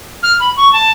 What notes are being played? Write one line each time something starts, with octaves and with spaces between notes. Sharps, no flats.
F6
B5
C#6
A5